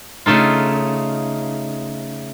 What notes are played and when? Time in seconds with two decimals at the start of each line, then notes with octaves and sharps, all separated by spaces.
0.26 C#3 A3 D#4 F4